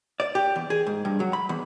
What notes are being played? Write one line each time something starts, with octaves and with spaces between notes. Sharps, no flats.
D5
G4
E2
G#4
G#2
G2
F#3
B5
E2